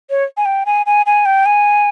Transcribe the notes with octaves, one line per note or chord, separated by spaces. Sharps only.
C#5
G#5
G5
G#5
G#5
G#5
G5
G#5